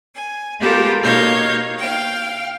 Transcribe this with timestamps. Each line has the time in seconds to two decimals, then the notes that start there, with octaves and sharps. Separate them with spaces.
0.14 G#5
0.59 G#3 B3 F4 G4 A4 A#4
1.02 B2 A#3 D#4 C#5 F5 G6
1.77 F5 G5